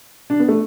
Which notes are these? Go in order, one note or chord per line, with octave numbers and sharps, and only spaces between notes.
D4
B3
A3